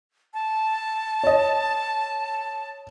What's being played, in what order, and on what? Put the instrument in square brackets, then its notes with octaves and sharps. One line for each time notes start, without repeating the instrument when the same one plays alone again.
[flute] A5
[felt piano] C#5 D#5